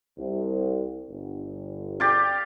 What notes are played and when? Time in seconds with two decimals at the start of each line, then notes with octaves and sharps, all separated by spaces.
0.18 C2
1.10 G1
2.00 G4 D5 F5